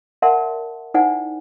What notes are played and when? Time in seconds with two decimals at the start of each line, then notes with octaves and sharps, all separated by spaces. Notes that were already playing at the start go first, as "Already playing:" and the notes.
0.22 A#4 D5 E5 F#5 A5 C6
0.94 D#4 E4 C5 D5 F#5 G#5